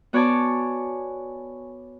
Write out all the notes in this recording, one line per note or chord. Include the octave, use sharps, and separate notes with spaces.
B3 F#4 C#5 D5 G#5 A5